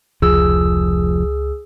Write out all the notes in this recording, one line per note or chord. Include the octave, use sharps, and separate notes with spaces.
F1 C#2 F3 G#4 E6